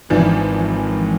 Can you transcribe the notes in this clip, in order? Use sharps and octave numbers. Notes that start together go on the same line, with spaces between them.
G#1 G#2 E3 F3 D4